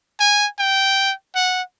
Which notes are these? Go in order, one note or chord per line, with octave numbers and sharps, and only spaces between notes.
G#5
G5
F#5